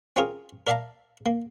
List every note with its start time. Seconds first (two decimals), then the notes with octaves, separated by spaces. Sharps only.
0.16 C4 C#4 F4 G#4 A#4
0.67 A#4 D5 E5 F5 A5 A#5
1.26 A#3